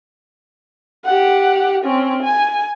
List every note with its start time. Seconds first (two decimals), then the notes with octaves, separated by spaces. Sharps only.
1.05 G4 F#5
1.85 C4 C#4
2.23 G#5